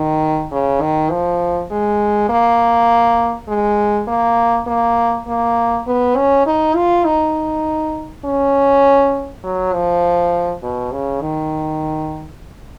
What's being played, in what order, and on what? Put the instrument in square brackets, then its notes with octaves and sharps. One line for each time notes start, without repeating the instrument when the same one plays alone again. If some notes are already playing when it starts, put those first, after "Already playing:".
Already playing: [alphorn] D#3
C#3
D#3
F3
G#3
A#3
G#3
A#3
A#3
A#3
B3
C#4
D#4
F4
D#4
C#4
F#3
F3
B2
C#3
D#3